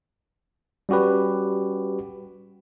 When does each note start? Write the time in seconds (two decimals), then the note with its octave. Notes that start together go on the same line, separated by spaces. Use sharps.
0.89 G3 C#4 F#4 G4 B4